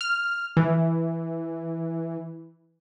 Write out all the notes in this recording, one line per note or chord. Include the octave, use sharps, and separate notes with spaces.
F6
E3